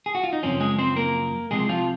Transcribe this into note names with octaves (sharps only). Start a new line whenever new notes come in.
G#4
F#4
F4
D#4
F#2 C#3 F3 C4 C#4
G#3 G#4
C4 C5
A#3 A#4
C2 C3 F3 G#3 G#4
F3 F4